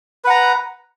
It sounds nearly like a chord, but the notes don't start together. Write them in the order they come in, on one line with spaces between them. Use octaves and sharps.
B4 F#5 A#5